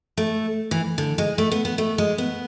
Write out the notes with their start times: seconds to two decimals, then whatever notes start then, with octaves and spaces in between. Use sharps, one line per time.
0.17 A3
0.71 E3
0.98 D3
1.18 G#3
1.38 A3
1.52 B3
1.65 B3
1.78 A3
1.98 G#3
2.18 B3